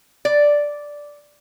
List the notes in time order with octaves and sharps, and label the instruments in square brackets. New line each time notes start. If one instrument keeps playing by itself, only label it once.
[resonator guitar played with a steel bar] D5